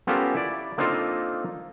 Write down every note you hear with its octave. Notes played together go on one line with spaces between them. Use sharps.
B3 C#4 F4 G4 A4 A#4
E4 D5
A#3 C4 D4 D#4 F4 A4